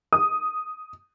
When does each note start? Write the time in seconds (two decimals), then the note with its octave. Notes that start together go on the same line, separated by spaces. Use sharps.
0.13 D#6